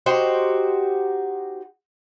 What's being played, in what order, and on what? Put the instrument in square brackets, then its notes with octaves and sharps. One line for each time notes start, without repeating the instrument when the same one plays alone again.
[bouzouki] D#4 F#4 G4 C5